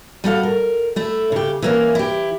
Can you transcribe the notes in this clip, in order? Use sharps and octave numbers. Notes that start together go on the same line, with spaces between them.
G3 F#4 A4 F5
A#4
A3 E4
C#3 G4
E3 A#3 C#4
E4 G4